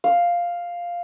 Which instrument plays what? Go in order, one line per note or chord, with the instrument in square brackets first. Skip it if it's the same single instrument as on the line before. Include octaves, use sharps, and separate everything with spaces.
[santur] F5